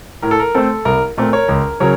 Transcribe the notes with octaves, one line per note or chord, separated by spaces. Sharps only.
A2 A#4
A4
A#4
A3 C4 A4
C2 A#4
A#2 A3 C4 A#4
A#4 C#5
C#2 A#4
C#3 F#3 A#4 C#5